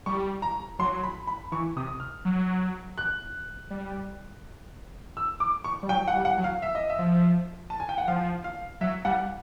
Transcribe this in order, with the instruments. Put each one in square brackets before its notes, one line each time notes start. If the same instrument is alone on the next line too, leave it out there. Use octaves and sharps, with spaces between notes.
[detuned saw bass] G3 [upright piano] C#6
[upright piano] A#5
[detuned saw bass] F#3 [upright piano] C6
[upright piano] B5
B5
[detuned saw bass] E3 [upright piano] C#6
[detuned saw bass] C3 [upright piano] D#6
[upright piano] F6
[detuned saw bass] F#3
[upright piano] F#6
[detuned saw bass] G3
[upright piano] E6
D6
C#6
[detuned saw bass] G3
[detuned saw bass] F#3 [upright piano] G5
[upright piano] F#5
[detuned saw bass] G3
[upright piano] F#5
[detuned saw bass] F#3
[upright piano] F5
E5
D#5
E5
[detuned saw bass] F3
[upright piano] A5
G#5
G5
F#5
[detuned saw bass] F3 [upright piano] F5
[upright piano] F5
[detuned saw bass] F#3 [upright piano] E5
[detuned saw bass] G3 [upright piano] F#5